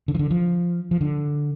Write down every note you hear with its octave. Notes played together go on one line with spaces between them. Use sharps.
D3
F3
D3
F3
F3
D3